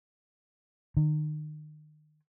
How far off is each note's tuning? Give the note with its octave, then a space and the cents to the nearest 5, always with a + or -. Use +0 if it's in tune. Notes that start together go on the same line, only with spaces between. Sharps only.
D#3 -35